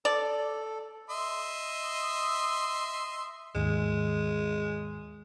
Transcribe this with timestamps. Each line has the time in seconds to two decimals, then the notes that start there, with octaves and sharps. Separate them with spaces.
0.05 A4 D5
1.10 D#5 E5 C6
3.55 D#2 G#2 G#3